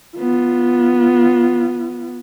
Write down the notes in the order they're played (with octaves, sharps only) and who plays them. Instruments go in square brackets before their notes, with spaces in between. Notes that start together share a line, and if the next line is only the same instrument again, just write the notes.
[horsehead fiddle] B3 F4